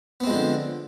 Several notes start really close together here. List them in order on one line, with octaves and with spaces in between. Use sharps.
B3 C4 G#3 F3 D3